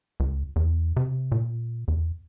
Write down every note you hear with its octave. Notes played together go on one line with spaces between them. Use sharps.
C#2
E2
C3
A#2
E2